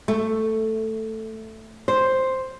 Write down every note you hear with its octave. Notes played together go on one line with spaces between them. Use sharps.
A3
C5